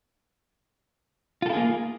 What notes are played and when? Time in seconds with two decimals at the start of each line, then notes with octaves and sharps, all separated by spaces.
1.42 F4
1.46 A4
1.49 E4
1.53 G#4
1.57 A#3